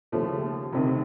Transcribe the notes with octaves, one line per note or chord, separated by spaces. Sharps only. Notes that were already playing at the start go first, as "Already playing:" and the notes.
D#2 C#3 F3 A3
F1 F2 C3 D#3